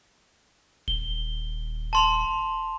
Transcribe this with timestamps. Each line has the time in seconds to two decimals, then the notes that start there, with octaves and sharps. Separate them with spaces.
0.88 D#1 G7
1.93 A5 C6 F7